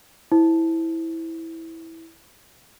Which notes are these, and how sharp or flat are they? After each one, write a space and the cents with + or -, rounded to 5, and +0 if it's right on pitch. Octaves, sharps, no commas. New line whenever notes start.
E4 -10 C5 +0